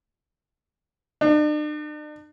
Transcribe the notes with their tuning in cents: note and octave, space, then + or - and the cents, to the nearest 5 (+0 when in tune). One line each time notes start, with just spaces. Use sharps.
D4 +45